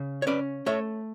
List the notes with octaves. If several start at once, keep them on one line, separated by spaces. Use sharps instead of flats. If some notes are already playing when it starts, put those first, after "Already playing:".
Already playing: C#3
C#5
C#4 B4 D5
A3 C#5 E5